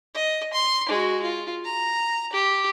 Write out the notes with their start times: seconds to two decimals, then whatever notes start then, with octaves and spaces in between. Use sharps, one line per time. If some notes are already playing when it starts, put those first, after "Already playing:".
0.14 D#5
0.53 C6
0.89 G#3 F#4
1.22 F4
1.65 A#5
2.32 G4